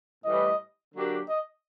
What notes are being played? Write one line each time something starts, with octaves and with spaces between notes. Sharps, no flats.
A2 E3 G3 D#5
D3 F#3 A#3 D4 G4
D#5